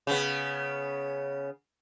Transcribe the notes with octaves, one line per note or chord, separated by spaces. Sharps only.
C#3 B3